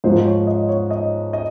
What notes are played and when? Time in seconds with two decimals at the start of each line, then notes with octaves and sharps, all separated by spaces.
0.04 G#2 F3 G#3 C5
0.26 C#5
0.47 D#5
0.69 C#5
0.91 D#5
1.33 D#5